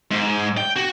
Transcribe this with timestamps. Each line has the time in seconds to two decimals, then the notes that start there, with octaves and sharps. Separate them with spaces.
0.11 G#2
0.58 G5
0.76 F#4